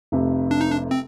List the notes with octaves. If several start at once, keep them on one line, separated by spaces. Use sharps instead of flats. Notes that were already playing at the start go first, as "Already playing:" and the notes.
F1 F2 C3
D4
D#4
D4
C4